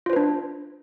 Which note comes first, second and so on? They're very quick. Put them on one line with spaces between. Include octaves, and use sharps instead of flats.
F4 C5 B4 D4